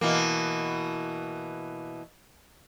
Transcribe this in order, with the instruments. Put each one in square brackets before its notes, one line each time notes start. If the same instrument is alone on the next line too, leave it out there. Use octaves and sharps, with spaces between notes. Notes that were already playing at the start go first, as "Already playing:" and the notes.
[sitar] B2 E3 A#3